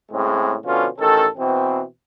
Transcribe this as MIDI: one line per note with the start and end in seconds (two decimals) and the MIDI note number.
0.12 0.55 45
0.12 0.55 49
0.12 0.55 56
0.12 0.55 60
0.65 0.86 47
0.65 0.86 50
0.65 0.86 53
0.65 0.86 61
0.65 0.86 65
0.98 1.26 33
0.98 1.26 51
0.98 1.26 61
0.98 1.26 69
1.37 1.81 47
1.37 1.81 52
1.37 1.81 60